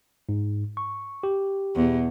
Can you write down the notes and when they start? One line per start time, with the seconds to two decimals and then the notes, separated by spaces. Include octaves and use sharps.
0.29 G#2
0.77 C#6
1.23 G4
1.75 E2 B2